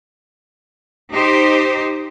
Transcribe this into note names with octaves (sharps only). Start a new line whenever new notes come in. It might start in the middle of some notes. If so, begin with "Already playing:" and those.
D#4 G4 C5